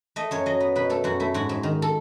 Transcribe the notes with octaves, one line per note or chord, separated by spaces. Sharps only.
A3 D#5
F#2 C#5
F#3 D#5
B3
B2 B4
A3 A4
F#2 F#4
A3 E4
G#2 F#4
G#2
D#3
A4